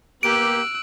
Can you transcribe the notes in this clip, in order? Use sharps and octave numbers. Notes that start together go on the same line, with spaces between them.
A#3 B3 G4 E6 F#6 D7